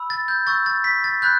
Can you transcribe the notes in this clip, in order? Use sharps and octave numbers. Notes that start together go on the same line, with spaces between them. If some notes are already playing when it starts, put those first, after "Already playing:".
Already playing: B5 E6
A6
G6
C#6 E6 G6 A6
A6
B6
A6
B5 F#6 G6